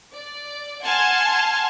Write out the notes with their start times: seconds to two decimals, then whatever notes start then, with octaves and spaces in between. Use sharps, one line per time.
0.13 D5
0.83 F#5 G#5 A5 C6 F6 G#6